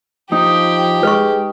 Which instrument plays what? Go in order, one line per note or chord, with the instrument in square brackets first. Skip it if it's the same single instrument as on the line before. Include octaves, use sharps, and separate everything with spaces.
[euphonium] F3 [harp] D#4 [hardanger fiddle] G4
[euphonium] G#3 [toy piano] B4 C#6